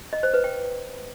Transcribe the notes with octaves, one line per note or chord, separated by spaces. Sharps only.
D#5
C5
B4
G5